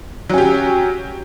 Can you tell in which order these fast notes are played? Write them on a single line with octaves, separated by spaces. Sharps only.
F#3 C#4 G4